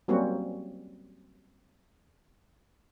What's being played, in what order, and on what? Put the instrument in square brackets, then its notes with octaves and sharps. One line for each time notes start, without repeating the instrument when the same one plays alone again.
[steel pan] F#3 G3 A#3 C4 C#4 F#4